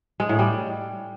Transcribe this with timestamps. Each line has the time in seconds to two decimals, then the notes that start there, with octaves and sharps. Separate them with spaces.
0.20 G#3
0.29 A2
0.39 G3